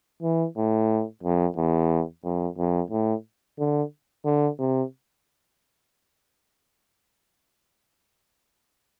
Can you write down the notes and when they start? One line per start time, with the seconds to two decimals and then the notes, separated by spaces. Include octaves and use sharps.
0.22 E3
0.57 A2
1.23 F2
1.57 E2
2.24 F2
2.58 F2
2.91 A2
3.59 D3
4.25 D3
4.59 C3